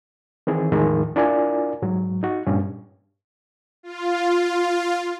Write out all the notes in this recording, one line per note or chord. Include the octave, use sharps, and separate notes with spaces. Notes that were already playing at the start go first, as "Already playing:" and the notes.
D#3 E3 C4 G#4
E2 A2 D#3 F3 G#3
D4 E4 F4 A#4 D5 G#5
G#2 F#3
D#4 F#4
G2 A#2 C#4
F4